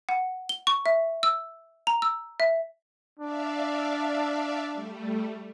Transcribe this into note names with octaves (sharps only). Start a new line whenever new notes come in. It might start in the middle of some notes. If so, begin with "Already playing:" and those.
F#5
G7
C#6
E5
E6
A#5
E6
E5
D4 D5 E5 F5
G3 A3